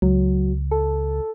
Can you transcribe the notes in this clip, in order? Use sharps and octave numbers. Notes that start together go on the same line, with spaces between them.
C#2 F#3
A4